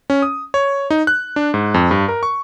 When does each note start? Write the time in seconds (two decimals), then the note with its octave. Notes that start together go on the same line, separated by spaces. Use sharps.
0.10 C#4
0.22 D#6
0.54 C#5
0.90 D#4
1.07 F#6
1.36 D4
1.54 G#2
1.74 F2
1.91 G2
2.08 A#4
2.23 C#6